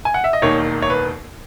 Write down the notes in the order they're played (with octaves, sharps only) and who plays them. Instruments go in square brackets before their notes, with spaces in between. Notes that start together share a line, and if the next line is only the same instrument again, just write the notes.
[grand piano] G#5
F#5
E5
D#5
E1 D#2 D#3 A#3 D#4 C#5
C#5
B4